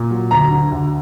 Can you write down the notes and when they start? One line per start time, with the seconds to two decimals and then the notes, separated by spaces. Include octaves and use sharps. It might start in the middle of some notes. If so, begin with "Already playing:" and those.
Already playing: A#2
0.11 F#3
0.31 D2 A#5
0.51 D3
0.71 D2